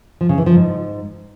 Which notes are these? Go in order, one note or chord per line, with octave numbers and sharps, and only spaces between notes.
F3
C#3
E3
F3
G#2